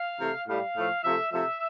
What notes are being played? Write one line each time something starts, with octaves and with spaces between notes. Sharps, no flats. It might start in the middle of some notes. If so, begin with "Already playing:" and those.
Already playing: F5
C3 E3 A3
A2 G3 F5
A2 F3 A3
C3 F3 A3 E5
C3 F3 A3 E5